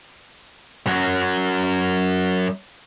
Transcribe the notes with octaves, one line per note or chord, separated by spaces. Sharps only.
F#2 F#3